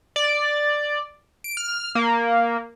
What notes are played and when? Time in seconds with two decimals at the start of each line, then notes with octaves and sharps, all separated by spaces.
0.16 D5
1.44 D7
1.57 F6
1.95 A#3